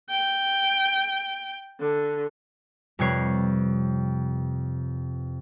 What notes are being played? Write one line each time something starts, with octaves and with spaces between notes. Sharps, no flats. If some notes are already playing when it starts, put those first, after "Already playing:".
G5
D3
F2 C3 G3 B4 C#5 C7